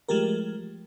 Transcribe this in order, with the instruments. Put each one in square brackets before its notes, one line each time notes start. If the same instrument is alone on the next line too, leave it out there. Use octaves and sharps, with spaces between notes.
[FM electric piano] F3 G#3 A3 G4 A#4